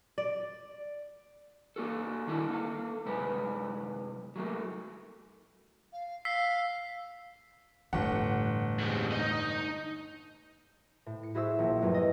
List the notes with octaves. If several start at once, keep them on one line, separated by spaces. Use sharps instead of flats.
D5
A#3 F#4 A4
D#3 D4 E4 A5
A#3 A4 F5
F#2 C3 G#3 B4
F#3 A3 A#3
F5
F5 E6 B6 C7
G1 E2 A2 F#5
G#2 C3
D#4 D#5
A2
C#7
E4 F#4 G#4 C5 E5 E6
A#1 F3
B1 E2 G2 F#3 A3
D#5